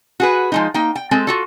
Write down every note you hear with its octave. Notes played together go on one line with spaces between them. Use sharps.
F#4 G#4 B4
F3 G#3 D#4
A#3 D#4 G5
G5
G#3 C4 A4
F4 F#4 A4